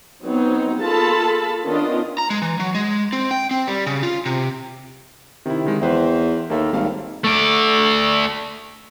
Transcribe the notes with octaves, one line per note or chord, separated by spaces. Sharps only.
F#3 B3 C4 D#4
A#3 F4 G#4 A4 A5 B5
D#3 B3 C#4 D4 F4 D#5
A#5
G#3
E3
F#3
G#3
C4
G5
C4
G3
C#3
F4
C3
C3 D#3 E4
D3 D#3 G#3
E2 B4 C5 G5
D#2 A#3 A4 E5
G#1 G3 F5
A3 D5